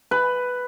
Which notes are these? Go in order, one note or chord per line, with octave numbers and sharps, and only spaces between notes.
B4